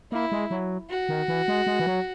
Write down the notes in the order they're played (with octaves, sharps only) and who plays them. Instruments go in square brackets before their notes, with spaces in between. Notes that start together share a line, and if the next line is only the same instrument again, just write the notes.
[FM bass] A#3 [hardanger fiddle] E4
[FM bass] G#3
F#3
[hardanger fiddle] F#4
[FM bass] D#3
E3
G#3
G#3
E3
F#3